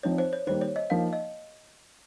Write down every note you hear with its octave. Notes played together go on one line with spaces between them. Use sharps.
F3 C4 D#4 C#5
C5
C#5
D#3 G3 A#3 C5
C#5
D#5
F3 A#3 D#4 F5
D#5